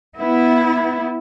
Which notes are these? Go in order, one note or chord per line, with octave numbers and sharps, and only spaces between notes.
B3 E4